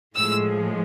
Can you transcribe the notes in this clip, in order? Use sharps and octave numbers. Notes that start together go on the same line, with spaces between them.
A2 F3 G#3 E6